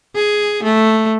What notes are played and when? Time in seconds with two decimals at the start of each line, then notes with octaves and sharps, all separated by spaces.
0.15 G#4
0.63 A3